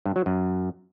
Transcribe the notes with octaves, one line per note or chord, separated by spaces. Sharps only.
G2
F#3
F#2